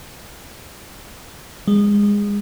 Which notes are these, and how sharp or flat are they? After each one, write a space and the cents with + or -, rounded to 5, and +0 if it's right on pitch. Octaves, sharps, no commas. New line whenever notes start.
G#3 -20